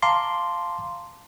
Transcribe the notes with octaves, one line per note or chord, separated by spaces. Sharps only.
F5 A5 A#5 C6 D6